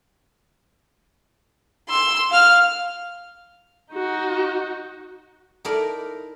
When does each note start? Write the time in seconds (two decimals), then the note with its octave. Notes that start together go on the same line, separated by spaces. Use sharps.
1.89 C6 E6
2.31 F5 F6
3.93 D#4 F#4
5.65 D#4 E4 A4 A#4 D5